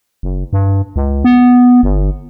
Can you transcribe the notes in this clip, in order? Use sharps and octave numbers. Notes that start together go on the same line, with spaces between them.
F#1
G2
C#2
B3
G1